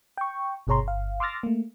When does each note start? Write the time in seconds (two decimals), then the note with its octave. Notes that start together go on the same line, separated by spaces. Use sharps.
0.18 G5 C#6
0.67 G1 B2 G#4 C#5 A#5 C6
0.83 G1 F5
1.20 C6 D6 E6 F6 A6 A#6
1.43 A3 A#3